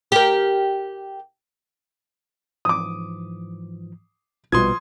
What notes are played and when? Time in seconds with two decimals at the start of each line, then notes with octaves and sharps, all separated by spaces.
0.12 G4 A#4
2.65 G#2 E3 F3 D6 D#6
4.52 A#1 B2 F3 G3 B4 C6 D#6 G#6